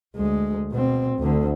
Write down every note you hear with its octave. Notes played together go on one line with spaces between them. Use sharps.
D2 G#3
B2 C4
D2 D3